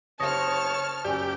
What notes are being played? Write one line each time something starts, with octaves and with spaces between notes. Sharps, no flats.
F#1 G4 C5 C#5 A5 D#6 F6 A#6
F#1 F#2 G4 D5 G#5